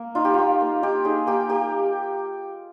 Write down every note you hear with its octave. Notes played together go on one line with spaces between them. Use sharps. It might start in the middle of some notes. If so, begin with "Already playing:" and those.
Already playing: A#3
D#4 F4
G4
A#3 F4
A#3
D#4 G4
D#4 G#4
A#3 G4
A#3 G4